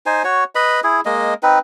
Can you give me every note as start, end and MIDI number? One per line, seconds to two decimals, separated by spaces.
0.06 0.23 63
0.06 0.23 72
0.06 0.23 80
0.24 0.44 66
0.24 0.44 73
0.55 0.80 71
0.55 0.80 75
0.55 0.80 83
0.84 1.01 64
0.84 1.01 68
1.05 1.34 56
1.05 1.34 58
1.05 1.34 75
1.43 1.59 60
1.43 1.59 63
1.43 1.59 71